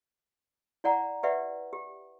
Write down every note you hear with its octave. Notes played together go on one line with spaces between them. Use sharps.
E4 D5 F#5 A#5
G4 B4 D5 E5 F#5
G4